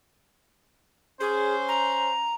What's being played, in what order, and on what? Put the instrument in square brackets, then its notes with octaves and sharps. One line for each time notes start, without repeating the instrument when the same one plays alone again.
[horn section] C#4 C5 [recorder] G#4
[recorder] A#5